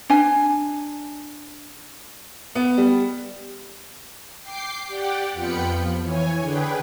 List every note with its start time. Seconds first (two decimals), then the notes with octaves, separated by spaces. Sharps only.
0.10 D4 G#5
2.55 B3
2.78 G3
4.42 G5 D6 C7
4.87 G4 D5 F#5 G5
5.33 F2 B3 F4 G5 B5 C#7
5.70 F3
6.00 E3 C#5 G#5
6.39 D3 G#4 B4 G5